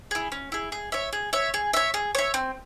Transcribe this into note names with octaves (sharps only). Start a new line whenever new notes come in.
E4 G#4
C#4
E4 G#4
G#4
C#5 E5
G#4
C#5 E5
G#4
C#5 E5
G#4
C#5 E5
C4